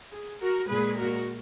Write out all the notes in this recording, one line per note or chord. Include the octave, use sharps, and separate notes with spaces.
G#4
F#4 A#4
A#2 G#3 G#4 B4
F#4 A#4